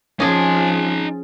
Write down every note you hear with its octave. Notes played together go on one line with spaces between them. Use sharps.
F3 C#4 D#4 G#4 A5